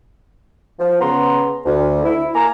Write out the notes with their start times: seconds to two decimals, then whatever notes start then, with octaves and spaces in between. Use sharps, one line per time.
0.79 F3
1.00 C#3 B3 A#5 C6
1.65 D2
2.04 E4
2.34 A#3 G#5 A#5